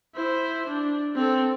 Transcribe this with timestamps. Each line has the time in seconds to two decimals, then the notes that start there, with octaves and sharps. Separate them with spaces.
0.15 E4 C5
0.67 D4
1.16 C4 A4